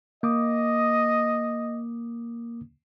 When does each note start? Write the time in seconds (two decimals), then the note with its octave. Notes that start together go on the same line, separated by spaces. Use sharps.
0.23 A#3 D#5 D6 D#6